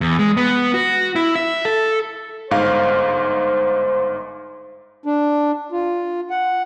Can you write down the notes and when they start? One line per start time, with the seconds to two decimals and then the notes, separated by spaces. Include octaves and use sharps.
0.01 E2
0.19 G#3
0.37 B3
0.74 F#4
1.15 E4
1.35 E5
1.65 A4
2.51 G1 G#2 C5 F5
5.05 D4
5.72 F4
6.30 F#5